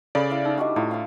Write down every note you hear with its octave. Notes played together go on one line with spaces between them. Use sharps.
C#3 A4 D5 F5 B5
E4 C5 F5
D#4 E6
G3 C#4 D4 F#4 D#5
A2 E4 F4
F5 A5